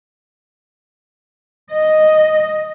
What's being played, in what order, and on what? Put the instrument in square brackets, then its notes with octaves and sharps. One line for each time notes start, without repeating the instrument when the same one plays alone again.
[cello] D#5